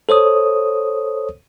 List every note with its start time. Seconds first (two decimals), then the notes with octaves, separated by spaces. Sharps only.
0.09 A4 C5 C#5 D#6